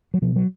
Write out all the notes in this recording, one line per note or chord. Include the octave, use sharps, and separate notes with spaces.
F#3
B2 F3
F#3